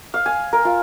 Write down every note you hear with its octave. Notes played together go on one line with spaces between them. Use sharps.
F5
G#5
A#4
F4